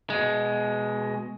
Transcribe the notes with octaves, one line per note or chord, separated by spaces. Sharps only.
B2 G#3